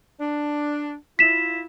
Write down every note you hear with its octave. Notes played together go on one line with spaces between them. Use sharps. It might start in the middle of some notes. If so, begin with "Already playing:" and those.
D4
E4 F4 B6 E7